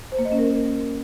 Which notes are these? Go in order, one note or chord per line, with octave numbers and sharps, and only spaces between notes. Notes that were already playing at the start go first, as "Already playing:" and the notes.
C5
A#3
D#5
C#4
A#4